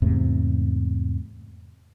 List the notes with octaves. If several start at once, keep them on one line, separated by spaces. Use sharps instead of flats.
E2 G#2 C3 A3